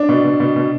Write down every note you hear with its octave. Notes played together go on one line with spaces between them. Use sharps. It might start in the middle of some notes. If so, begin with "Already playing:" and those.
Already playing: D4
B2
B2
B2
B2